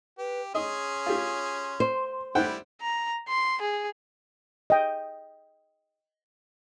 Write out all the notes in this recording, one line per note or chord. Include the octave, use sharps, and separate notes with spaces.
G4 B4
C#4 G#4 D#5 C6
F4 G4
C5
G3 E4 C5 F#5 G5
A#5
C6
G#4
D#5 G5